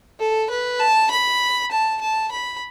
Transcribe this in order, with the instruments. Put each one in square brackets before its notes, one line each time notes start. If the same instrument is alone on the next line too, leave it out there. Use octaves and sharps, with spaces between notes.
[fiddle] A4
B4
A5
B5
A5
A5
B5